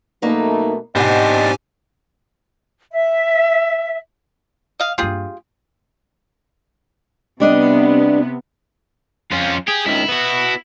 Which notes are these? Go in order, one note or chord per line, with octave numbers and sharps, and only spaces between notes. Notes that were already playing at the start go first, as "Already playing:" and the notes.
F#2 B2 A3 A#3 D#4 B4
G#2 B2 C4 D4 G4 D#5 F#5 G#5
E5
D#5 F5
G2 A#3 F4 G4 G#4
C3 G3 B3 D4 D#5
F2 C#4 F4
G4 G#4
C#2 D#3 E4
B3 F#4